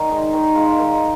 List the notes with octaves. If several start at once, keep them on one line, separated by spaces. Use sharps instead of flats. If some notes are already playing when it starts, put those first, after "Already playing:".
Already playing: D#3
G#3 D#4
D#3
G#3 F4
D#3